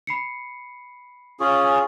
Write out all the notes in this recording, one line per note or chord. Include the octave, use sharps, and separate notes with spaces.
B5 C7 C#7
C#4 F4 G#4 C#6